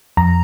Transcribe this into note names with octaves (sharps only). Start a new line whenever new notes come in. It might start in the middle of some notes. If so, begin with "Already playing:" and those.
F2 A#5